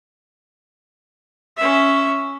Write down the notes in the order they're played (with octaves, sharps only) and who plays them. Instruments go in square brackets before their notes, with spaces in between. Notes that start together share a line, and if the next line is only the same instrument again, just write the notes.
[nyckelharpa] C#4 E5